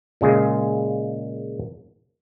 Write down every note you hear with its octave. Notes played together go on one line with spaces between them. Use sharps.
A#2 C#3 G#3